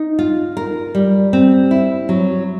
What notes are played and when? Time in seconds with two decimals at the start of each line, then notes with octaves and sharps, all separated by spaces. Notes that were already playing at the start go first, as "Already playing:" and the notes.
Already playing: D#4
0.19 F4
0.57 A#4
0.95 G3
1.33 C4
1.71 E4
2.09 F#3